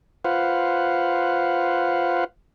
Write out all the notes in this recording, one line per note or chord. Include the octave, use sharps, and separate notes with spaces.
F4 B4 C5 F5 F#5